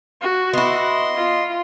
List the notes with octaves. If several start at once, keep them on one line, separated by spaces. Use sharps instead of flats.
F#4
B3 E4 D#5 C6
F4